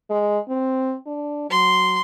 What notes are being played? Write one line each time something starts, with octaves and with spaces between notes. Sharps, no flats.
G#3
C4
D4
F#3 C6